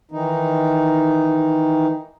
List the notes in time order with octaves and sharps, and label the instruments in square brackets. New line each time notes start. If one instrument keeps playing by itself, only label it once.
[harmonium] D#3 E3 D#4